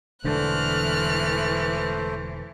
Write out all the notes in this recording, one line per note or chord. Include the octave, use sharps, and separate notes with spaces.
E1 D3 E3 A3 C5 F6 F#6